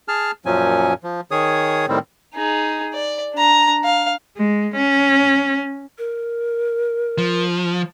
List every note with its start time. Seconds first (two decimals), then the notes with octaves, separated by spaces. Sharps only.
0.08 G#4 A5 F6
0.46 F#2 A#2 F3 F#3 C#4 G#5
1.04 F3
1.31 D#3 G#4 C#5 D#6
1.88 A2 D#3 G3 C4
2.34 D#4 G#4
2.94 D5
3.34 D4 A#5
3.84 F5
4.37 G#3
4.75 C#4
5.98 A#4
7.18 F3